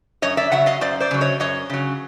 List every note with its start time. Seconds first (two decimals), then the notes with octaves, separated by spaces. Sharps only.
0.22 F#2 C#5 D#5
0.37 D5 E5
0.51 C#3 F#3 E5 F#5
0.66 D#5 F5
0.81 F#2 C5 D5
1.00 C5 D5
1.11 C#3 F#3
1.21 C#5 D#5
1.40 F#2 C#5 D#5
1.70 C#3 F#3